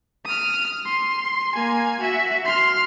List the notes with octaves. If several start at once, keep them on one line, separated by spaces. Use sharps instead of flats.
D#6 F6
C6
A#3 G#5
F#4 E5
C6 F6